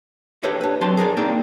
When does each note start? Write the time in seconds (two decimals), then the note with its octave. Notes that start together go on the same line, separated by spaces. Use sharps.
0.43 D4 G4 A4 B4 C#5 D#5
0.61 D4 B4
0.81 F#3 C4 A4 A5 C6
0.97 G#4 A#4 B4 D5
1.17 G3 A#3 C4 D#4 D5